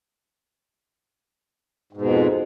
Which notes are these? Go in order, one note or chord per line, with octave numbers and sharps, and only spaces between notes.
F2 G#2 B2